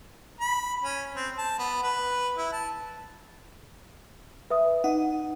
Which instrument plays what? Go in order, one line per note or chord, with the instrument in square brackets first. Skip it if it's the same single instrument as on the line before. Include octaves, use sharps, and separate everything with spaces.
[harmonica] B5
C#4
C4
A5
B3
B4
E4
A5
[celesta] B4 E5 D#6
[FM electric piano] D#4 [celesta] F#5